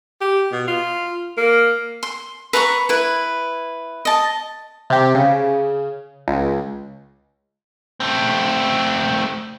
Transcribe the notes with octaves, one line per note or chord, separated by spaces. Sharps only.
G4
B2
F4
A#3
C6
B4 A#5 C6 C#6
E4 B4
D#5 A5
C3 G4
C#3
C#2
A3 C4